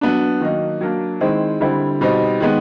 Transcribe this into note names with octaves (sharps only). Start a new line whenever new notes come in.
F#3 B3 D4
D#3 F#3 A#3 D#4
F#3 A#3 D4
D#3 G#3 C4 E4
D3 G3 C4 E4
B2 G3 C4 D#4
D#3 G#3 B3